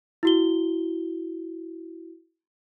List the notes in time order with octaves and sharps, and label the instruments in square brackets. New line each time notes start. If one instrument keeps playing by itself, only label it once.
[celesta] E4 F#4 G7